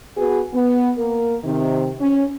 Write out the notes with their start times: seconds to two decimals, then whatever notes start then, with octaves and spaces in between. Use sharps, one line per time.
0.17 B3 F#4 G#4 B4
0.53 B3
0.97 A#3 A#4
1.44 C3 D#3
1.99 C#4